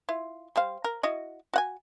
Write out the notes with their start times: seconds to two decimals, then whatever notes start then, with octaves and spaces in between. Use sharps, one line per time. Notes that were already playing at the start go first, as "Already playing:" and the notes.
0.09 E4 F4
0.56 G3 C5 F5
0.84 A#4
1.03 E4 F#4 D#5
1.54 F#4 F#5 G#5